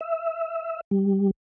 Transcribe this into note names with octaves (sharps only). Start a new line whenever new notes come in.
E5
G3